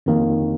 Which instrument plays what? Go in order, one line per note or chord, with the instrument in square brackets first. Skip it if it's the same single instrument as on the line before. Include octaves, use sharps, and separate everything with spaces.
[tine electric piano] F2 D#3 A#3